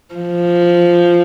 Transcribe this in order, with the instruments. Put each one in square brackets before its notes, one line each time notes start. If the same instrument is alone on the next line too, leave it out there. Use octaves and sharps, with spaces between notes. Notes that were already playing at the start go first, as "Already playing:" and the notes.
[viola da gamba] F3